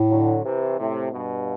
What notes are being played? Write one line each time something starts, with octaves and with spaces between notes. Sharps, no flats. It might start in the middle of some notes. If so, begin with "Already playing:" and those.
Already playing: A2
D3 F#3
C3 E3
A2 C3
G2 B2